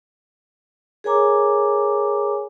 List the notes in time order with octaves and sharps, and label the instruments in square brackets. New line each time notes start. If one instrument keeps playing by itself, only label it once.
[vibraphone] G#4 A#4 C#5 G#5 A#5 D6